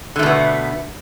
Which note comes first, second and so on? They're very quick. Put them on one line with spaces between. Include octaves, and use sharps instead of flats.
D3 A3 B2 B3